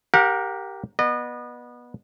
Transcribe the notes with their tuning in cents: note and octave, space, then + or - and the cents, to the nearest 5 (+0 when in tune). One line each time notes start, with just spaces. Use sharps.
G4 -5 A#4 +0 F#5 -40
B3 -20 D#5 -35